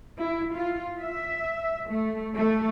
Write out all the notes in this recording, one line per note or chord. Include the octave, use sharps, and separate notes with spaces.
E4
F4
E5
A3
A3